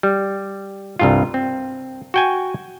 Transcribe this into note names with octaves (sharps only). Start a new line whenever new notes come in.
G3
C2 G2 F4
C4
F#4 G5 G#5